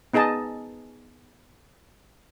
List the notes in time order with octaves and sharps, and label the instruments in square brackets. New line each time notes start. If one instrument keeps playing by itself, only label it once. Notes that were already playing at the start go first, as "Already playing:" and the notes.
[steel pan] B3 D#4 G#4 D#5 A5